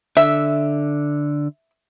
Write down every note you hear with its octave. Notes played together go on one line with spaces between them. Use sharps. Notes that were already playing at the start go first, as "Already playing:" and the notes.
D3 E5